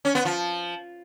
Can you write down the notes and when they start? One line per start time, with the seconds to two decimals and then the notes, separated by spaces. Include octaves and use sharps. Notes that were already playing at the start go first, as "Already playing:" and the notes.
0.05 C#4
0.15 B3
0.25 F3